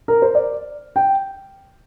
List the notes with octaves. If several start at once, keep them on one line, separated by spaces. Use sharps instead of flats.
A#4
C5
D5
G5